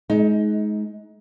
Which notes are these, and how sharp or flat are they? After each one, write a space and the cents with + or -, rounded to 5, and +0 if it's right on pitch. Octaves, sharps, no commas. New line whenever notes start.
G#3 +30 D#4 +20